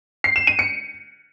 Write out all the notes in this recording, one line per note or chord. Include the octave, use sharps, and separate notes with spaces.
C7
E7
D#7
C#7